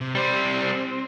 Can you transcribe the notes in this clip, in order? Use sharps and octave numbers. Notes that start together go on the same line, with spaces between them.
C3
G3 C4 C5